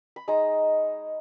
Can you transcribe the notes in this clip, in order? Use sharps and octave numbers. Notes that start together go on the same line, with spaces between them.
B5
G#3 D#4 A#5